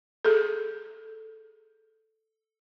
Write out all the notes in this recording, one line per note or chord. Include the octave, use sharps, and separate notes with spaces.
G#4 A4